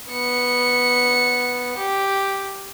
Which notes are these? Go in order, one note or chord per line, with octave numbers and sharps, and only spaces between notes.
B3 C#7
G4